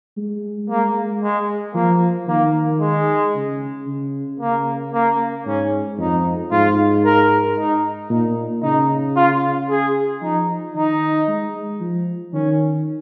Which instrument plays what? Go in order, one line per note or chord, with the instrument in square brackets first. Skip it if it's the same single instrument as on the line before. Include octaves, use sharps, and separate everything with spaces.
[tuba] G#3
[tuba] G#3 [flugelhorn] A#3
[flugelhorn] G#3
[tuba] F3 [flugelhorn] A#3
[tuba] D#3 [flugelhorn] A#3
[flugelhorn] G#3
[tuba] C#3
C#3
[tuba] C#3 [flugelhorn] A#3
[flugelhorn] A#3
[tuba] G#2 [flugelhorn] C#4
[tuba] F2 [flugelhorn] D#4
[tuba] G#2 [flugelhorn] F4
[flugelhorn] A#4
D#4
[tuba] A#2 [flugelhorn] D#4
[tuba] C#3 [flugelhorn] D#4
[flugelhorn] F4
G#4
[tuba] F3 [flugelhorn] D#4
[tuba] D#3 [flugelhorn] D#4
[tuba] G#3
F3
[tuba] D#3 [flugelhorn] C#4